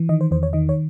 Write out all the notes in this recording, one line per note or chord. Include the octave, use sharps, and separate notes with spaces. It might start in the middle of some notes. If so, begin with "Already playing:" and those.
Already playing: E3
D#3 D#5
C5
E2 C5
C#5
D#3 D#5
C#5